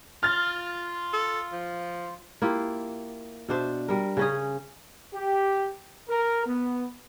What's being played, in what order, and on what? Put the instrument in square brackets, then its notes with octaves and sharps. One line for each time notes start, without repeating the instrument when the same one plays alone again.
[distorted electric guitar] F4 [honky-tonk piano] F6 A6
[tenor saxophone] A4
F3
[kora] A#3 E4 F4 G4
B2 D4 C5 E5
G3 A#4
C#3 C#4 G#4
[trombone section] G4
A#4
B3